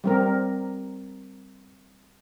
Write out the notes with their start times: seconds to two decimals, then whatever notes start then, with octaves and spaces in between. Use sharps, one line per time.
0.04 G3 C4 A#4